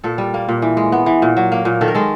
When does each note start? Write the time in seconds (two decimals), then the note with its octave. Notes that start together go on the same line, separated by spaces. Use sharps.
0.04 A#2 A4
0.18 G3
0.34 A#3
0.49 A#2
0.62 E3
0.77 G#3
0.92 B3
1.06 E3
1.22 A#2
1.37 F#3
1.52 A#3
1.65 A#2
1.81 D#3 A4
1.88 A#4
1.95 G#3 A4